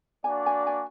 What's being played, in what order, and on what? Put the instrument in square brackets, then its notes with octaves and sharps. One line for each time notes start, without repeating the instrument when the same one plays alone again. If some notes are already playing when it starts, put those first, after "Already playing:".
[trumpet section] A#3 D4 F#4 D5 [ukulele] G#5
[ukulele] G#5
G#5